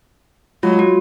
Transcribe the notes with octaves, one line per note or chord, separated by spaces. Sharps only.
F#3 G#3 F4
F#4